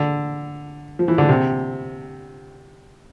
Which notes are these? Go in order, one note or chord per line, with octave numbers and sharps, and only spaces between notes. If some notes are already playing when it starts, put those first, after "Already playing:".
Already playing: D3
F3
E3
D3
C3